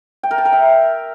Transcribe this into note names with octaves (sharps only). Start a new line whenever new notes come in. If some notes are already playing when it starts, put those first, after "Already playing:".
G5
A#4
A5
A#4
E5